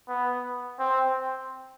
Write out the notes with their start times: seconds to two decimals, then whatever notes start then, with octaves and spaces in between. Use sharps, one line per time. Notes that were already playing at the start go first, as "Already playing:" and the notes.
0.08 B3
0.79 C4